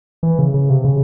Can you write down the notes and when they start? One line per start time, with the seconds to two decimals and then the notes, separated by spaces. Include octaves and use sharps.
0.23 E3
0.39 C#3
0.54 C#3
0.69 C3
0.85 C#3